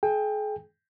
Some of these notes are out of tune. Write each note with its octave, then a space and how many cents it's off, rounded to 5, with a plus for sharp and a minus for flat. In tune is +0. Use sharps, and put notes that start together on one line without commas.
G#4 +40 G5 +20